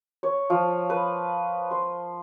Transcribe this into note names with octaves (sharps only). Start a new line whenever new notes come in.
C#5
F3
B4
C6